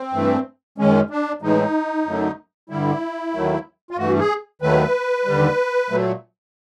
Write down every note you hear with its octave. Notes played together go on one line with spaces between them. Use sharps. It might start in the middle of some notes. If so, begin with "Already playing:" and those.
Already playing: C4
G2 E3 A3
F#2 D#3 G#3 C#4
D4
A2 E3 G#3 D#4
F#2 D3 F#3 A3
G2 D3 G3 E4
D#2 D#3 F#3 A3
F4
G2 E3 A3 F#4
G#4
D#2 D#3 F#3 A3 B4
D#2 D3 G3
A#2 F#3 A3